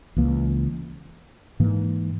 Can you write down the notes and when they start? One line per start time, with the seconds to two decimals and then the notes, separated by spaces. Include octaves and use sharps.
0.16 C#2 C#3 E3 A#3
1.60 G#2 E3 A#3